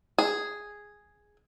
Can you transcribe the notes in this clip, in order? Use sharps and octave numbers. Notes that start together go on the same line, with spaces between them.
G#4